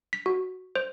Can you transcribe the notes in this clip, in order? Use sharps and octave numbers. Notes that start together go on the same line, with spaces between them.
B6
F#4
C5